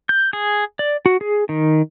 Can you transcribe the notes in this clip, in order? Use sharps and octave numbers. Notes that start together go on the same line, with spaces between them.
G6
G#4
D5
F#4
G#4
D#3